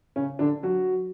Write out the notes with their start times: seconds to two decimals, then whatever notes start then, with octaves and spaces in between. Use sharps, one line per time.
0.16 C#3 C#4
0.39 D3 D4
0.63 F#3 F#4